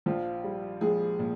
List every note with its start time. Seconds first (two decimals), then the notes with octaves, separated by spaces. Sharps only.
0.06 A#1 F3 F4
0.44 G3
0.81 A#1 G#3 G#4
1.19 A#2